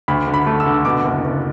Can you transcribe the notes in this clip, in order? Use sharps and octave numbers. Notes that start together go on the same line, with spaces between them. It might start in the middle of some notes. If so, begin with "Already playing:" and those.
D2 B5
D3
B5
A3
E6
D3
B2 D6
F#1
F#1